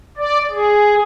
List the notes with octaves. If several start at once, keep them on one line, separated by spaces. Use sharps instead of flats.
D5
G#4